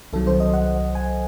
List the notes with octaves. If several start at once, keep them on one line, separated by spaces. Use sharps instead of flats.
C2 C3 D#3 F#3 A4
C5
D#5
F#5
G#5